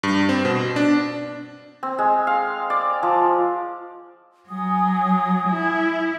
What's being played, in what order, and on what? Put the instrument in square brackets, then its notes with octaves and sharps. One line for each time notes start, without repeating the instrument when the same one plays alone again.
[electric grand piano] G2
C4
B2
D4
[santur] C4
G#3
F5
D5
F3
[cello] F#3 [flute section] G#5 D#6
[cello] E4